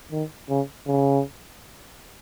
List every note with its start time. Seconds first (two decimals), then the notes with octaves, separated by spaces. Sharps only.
0.12 D#3
0.50 C#3
0.87 C#3